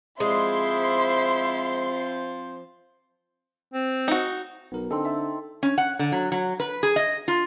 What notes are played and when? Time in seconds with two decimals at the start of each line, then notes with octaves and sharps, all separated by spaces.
0.20 F3 G#3 C4 E4 C5 C6
3.73 C4
4.08 D#4 F#4
4.72 B1 B3 A#4
4.91 D3 C4 D#4 A4
5.05 E5 A5
5.63 C#4
5.78 F#5
5.99 D3
6.12 F#3
6.32 F#3
6.60 B4
6.83 G#4
6.96 D#5
7.28 F4